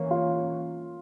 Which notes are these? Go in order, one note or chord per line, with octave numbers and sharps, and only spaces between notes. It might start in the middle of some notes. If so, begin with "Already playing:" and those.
Already playing: E3 A#3 C#4
F4